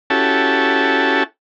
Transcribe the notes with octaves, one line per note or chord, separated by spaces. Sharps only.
C#4 E4 F#4 G4 A4 A5